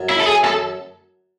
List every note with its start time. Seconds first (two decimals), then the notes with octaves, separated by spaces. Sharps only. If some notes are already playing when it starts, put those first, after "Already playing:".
Already playing: F#2
0.09 E4
0.20 A4
0.26 G#4
0.44 A4